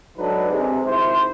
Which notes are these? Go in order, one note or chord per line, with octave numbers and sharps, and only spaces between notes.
G#2 F#3 D4 D#4 A4 B4
C3 G#3
G#1 G#2 E4 C5